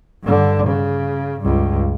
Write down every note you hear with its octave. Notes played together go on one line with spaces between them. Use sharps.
G2 D3
C#3
C#2 G2